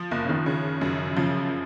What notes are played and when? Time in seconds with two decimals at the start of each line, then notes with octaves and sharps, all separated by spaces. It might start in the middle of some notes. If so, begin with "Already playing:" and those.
Already playing: F3
0.11 F#1 A#3
0.24 C#3
0.29 D#3
0.46 C#3
0.81 F#2
1.16 C#3 F3